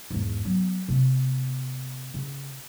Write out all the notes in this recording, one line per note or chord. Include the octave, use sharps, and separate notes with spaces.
E2 G#2
F#3 B3
C3 B3
C#3